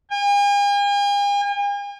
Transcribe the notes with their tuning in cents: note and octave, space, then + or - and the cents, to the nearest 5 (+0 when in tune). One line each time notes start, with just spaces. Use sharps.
G#5 -45